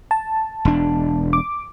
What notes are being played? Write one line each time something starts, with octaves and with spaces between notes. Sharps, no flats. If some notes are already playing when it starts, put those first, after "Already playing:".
A5
E1 D4
D6